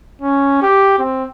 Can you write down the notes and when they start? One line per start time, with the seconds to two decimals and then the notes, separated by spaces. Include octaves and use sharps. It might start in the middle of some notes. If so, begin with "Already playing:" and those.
0.22 C#4
0.62 G4
0.98 C4